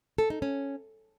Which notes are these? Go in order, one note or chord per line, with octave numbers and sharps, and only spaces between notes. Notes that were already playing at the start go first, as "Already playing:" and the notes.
A4
D#4
C#4